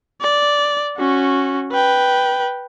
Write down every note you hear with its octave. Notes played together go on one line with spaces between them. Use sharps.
D5
C#4 F#4
B4 G5